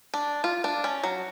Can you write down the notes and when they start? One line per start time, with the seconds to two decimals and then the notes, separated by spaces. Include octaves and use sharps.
0.14 D4
0.44 F4
0.64 D4
0.84 C#4
1.04 F#3